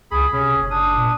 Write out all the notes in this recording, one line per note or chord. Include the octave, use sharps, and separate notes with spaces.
C#2 G#4 B5
C3 C#4 G#4
F#1
D4 D#6
A#2